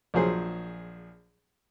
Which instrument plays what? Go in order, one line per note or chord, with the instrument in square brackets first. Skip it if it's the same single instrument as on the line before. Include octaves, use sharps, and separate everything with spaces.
[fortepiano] A#1 F3 F#3 G#4 C5